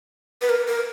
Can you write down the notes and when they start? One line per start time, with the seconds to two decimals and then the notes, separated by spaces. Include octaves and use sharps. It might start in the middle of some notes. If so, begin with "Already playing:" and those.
0.42 B4
0.49 A#4
0.68 A#4